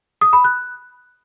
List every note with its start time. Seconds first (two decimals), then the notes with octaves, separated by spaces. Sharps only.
0.21 D#6
0.33 B5
0.44 F#6